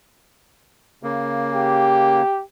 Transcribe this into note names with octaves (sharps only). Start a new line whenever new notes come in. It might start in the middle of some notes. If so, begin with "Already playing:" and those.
C#3 A#3
G4